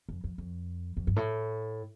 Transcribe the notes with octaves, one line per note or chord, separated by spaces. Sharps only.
F2
F2
F2
F2
G2
A2